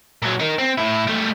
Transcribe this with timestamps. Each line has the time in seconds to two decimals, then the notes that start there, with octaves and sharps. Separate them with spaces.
0.22 A#2 F#3
0.40 D#4 A#4
0.59 C4
0.78 A2 E4
1.07 G3 A3